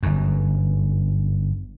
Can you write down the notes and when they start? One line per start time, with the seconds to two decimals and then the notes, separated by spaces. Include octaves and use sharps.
0.03 G1 F#2